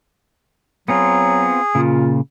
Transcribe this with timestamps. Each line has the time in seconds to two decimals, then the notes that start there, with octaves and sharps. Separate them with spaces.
0.88 F#3 B3 C4 F4 G#4
1.75 A#2 C#3 F4